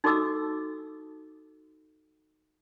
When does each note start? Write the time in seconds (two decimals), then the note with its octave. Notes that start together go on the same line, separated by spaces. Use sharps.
0.04 D#4 F#4 A4 D#5 D6 E6